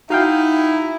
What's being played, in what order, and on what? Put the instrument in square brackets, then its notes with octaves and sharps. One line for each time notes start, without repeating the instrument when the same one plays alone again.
[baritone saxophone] D#4 [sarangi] E4 [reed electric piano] F#4 F5 G5